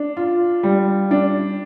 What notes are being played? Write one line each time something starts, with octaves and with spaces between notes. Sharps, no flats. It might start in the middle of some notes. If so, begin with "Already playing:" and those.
Already playing: D4
F4
G3
D4